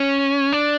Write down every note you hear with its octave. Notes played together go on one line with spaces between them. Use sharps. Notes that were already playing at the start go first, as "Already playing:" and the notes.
Already playing: C#4
D4